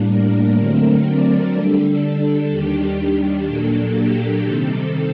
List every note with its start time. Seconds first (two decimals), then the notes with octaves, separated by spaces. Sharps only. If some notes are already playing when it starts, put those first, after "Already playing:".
Already playing: A2 G3 A#3 D4
0.09 A#4
0.58 D3 F#3 A3 C4
1.06 D5
1.54 D3 G3 D4 A4
2.51 D#2 D#3 G3 D4 G4
3.47 A#2 F#3 A#3 D4 A4
3.96 G4
4.44 C3 D#3 G3 C4 A4